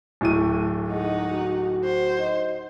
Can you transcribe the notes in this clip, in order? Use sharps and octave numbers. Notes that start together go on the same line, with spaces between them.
D1 A2 D#7
G#3 D#4 F#5
F#4
C5
D#4